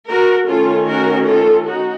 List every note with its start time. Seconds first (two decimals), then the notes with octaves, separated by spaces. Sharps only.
0.09 F#4 A#4
0.48 D#3 A3 C#4 F4 A4
0.88 F#4 A#4
1.27 F4 A4
1.67 D#4 F#4